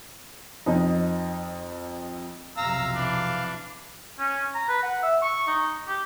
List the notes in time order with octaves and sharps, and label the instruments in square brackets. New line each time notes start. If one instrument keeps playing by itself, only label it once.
[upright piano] F2 D#4
[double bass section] B1 F2 C3 [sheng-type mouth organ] F5 [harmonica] A#5 E6
[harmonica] E3 D4
[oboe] C#4
A#5
B4
F#5
E5
C#6
D#4
G4